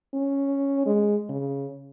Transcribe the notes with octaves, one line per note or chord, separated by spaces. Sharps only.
C#4
G#3
C#3